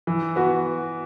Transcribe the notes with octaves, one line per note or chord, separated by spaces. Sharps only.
E3
B3 F#4